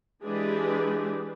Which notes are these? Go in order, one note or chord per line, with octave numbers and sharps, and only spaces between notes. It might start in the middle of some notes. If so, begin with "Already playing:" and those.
E3 G#3 D4 G4 G#4 B4